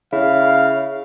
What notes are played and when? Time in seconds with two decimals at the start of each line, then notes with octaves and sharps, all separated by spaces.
0.13 C#3 E4 F5